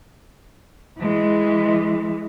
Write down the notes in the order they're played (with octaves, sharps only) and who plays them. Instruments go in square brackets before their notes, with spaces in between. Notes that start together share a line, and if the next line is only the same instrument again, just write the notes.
[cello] E3 G#3